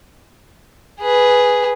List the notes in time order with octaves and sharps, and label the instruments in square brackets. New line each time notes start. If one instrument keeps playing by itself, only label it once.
[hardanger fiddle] G#4 B4